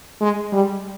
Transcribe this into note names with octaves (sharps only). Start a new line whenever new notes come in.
G#3
G3